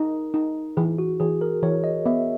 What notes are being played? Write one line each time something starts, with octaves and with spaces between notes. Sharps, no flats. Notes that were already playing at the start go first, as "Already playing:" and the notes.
Already playing: D#4 A#4
D#4
E3 G#4
F#4
E3 G#4
A#4
E3 C#5
D#5
B3 E5